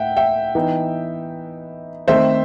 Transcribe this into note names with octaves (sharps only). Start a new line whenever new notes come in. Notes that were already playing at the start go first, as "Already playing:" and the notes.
Already playing: A2 E5 F#5 G5
E5 G5
E3 B3 D#4
D#3 A3 C4 D#4 C5 E5